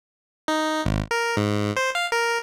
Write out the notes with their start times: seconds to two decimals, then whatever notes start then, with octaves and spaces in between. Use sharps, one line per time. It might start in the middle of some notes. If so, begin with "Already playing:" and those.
0.48 D#4
0.86 G#1
1.11 A#4
1.37 G#2
1.77 C5
1.95 F5
2.12 A#4